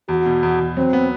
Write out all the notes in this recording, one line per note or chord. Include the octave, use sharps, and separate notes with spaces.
E2 F#4
B2
E2
E2
F#3 C4
B3